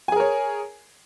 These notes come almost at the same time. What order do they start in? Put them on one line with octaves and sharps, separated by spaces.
G#5 G#4 A#4 C#5